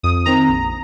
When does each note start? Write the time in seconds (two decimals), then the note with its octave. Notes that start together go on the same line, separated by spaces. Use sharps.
0.03 F2 D#6
0.26 D#3 C4 A#5
0.49 A#1